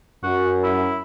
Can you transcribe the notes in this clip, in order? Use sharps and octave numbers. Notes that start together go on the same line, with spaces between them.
F#2 F#4
E4